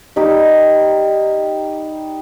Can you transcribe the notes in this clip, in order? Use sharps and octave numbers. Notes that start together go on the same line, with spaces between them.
G3 D#4 G4